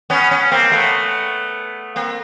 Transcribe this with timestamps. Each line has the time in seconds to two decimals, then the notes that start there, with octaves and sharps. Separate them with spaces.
0.10 B3 C#4
0.31 B3 C#4
0.51 A#3 C4
0.72 A3 B3
1.96 A#3 C4